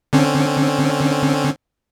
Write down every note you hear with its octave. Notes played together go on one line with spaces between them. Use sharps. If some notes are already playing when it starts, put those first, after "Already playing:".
D3 C4 C#4